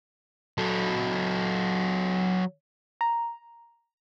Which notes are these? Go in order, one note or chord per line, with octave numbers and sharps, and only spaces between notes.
F#3 A4
A#5